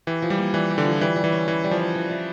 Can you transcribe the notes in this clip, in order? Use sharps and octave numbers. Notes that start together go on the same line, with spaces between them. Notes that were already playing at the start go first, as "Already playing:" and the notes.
E3 G4
F3
G3
A#3
E3 D4
G4
D3
F3
E3 G3
G3
E3
C#4
E3 E4
G3
F3
G3
E3
E3